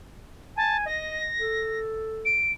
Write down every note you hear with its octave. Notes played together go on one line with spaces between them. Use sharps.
G#5 A5
D#5 A#6
A4
D7